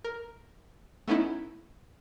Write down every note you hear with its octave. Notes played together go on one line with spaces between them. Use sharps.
A#4
A3 B3 C#4 D#4 E4